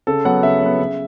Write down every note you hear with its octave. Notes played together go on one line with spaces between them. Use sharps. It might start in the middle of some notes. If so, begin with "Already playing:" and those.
C#3 A4
F#3 B3 F#5
C#3 E5
F#3 B3
C#3